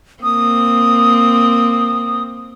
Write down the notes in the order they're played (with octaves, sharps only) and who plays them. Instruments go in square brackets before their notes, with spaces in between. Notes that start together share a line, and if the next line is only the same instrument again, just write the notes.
[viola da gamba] A#3 C4 [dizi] D#6